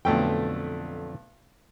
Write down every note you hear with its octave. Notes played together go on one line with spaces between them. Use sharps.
B1 F2 D3 A3 G5